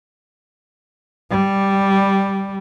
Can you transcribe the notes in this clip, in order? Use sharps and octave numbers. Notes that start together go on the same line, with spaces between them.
G3